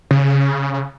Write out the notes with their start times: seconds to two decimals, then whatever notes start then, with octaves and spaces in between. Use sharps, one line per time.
0.11 C#3